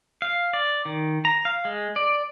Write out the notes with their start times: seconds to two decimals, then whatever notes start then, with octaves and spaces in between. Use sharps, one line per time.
0.22 F5
0.53 D5
0.85 D#3
1.25 A#5
1.45 F5
1.65 G#3
1.96 D5